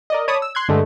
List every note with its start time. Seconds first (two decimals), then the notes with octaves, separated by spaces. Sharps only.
0.10 A#4 D5 D#5
0.28 C#5 D5 A5 B5 D#6
0.42 E6
0.55 C6 F#6 G#6
0.69 G2 D3 G#3 A3